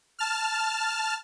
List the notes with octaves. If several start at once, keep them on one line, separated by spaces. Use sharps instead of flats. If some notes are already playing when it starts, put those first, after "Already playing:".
A5 F6